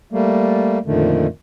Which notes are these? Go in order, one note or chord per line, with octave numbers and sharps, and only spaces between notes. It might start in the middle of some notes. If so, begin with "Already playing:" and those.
G3 A3 A#3
F2 A#2 D3 D#3 A3